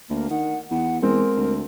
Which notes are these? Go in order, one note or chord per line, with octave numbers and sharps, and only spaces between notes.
D2 A#3
D#3 F#5
E2 F#5
E2 G#3 C4 A#4
D2